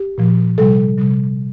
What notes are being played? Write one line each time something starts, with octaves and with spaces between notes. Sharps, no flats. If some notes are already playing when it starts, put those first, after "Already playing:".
Already playing: G4
A#2 F3
C3 G3 A4
C3 G3